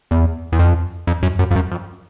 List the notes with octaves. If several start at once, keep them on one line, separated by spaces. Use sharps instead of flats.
E2
E2
F2
F2
F#2
F#2
F2
F#2
F2